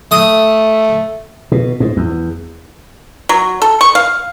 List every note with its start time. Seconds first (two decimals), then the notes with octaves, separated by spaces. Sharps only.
0.12 A3 D#6
1.52 B2
1.80 G#2
1.97 E2
3.29 F#3
3.62 A4
3.81 C#6
3.95 F5